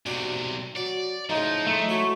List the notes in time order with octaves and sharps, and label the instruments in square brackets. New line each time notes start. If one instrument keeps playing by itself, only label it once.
[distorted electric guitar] B1 C3 [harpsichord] D4 F#4 G#5
[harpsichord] F#3 [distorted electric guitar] D5
[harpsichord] A2 C#3 [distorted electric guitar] F3 [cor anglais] D#4
[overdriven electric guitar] A3
[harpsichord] F#3 E4 C6 [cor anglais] C#5